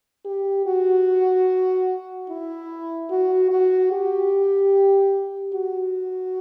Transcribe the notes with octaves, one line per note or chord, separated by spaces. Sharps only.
G4
F#4
E4
F#4
F#4
G4
F#4